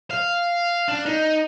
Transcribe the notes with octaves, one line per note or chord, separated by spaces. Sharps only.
F5
D4
D#4